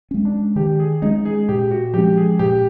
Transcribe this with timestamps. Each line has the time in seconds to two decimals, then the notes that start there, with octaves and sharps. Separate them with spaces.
0.11 G#3 C#4
0.25 D4
0.56 D#3 G4
0.79 G#4
1.02 G#3 C#4 D#4
1.25 G#4
1.49 A#2 G4
1.71 F#4
1.94 F3 G#3 C#4 G4
2.17 G#4
2.39 A#2 G4